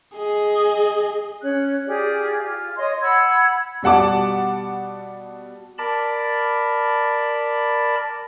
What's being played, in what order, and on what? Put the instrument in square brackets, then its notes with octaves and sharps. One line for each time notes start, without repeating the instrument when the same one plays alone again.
[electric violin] G#4 D#5
[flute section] C#4 F#6
F4 G4 G#4 D5
F4
C#5 D#5 C6
F#5 B5 E6 G#6
[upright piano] B2 G3 F#5 A5 D6
[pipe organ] A#4 D5 A5 B5